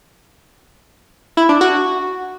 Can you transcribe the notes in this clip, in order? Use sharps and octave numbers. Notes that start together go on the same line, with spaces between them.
E4
D4
F#4